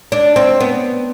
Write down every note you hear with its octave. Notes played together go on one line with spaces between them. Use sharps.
D4
C4
B3